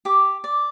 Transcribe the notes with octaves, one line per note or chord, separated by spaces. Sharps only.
G4 D6
D5